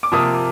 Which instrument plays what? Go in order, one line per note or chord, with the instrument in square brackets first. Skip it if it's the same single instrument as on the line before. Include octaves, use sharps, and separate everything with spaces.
[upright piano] D6
C3 F3 A#3 D#6